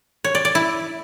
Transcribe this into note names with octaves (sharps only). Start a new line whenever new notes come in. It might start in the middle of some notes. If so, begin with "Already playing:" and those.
C#5
D5
D5
E4